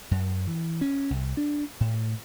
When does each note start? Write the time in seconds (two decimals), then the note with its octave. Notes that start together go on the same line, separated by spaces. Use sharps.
0.11 F#2
0.47 E3
0.81 C#4
1.10 C2
1.37 D4
1.80 A2